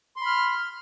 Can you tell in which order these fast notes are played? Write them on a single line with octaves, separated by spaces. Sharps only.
C6 B5 F6